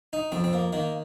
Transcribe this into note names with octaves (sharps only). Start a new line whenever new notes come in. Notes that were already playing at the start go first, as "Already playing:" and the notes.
D#4
F2 C4
C4
A#3
D#3 A#3